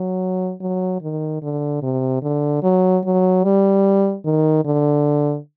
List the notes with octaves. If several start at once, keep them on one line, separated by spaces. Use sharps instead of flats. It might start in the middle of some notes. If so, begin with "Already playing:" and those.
Already playing: F#3
F#3
D#3
D3
C3
D3
F#3
F#3
G3
D#3
D3